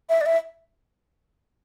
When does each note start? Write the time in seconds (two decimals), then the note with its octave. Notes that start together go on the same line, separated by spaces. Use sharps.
0.09 E5
0.21 D5
0.26 E5